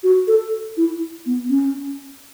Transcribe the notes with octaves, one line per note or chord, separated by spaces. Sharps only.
F#4
A4
E4
B3
C#4